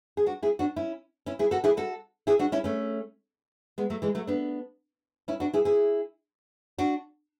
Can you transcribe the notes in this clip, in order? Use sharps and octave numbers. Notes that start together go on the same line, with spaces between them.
G#4
D4 F#4
E4 G#4
D4 F#4
C#4 E4
C#4 E4
E4 G#4
F#4 A4
E4 G#4
F#4 A4
E4 G#4
D4 F#4
C#4 E4
A3 C#4
G#3 B3
F#3 A3
E3 G#3
F#3 A3
B3 D4
C#4 E4
D4 F#4
E4 G#4
E4 G#4
D4 F#4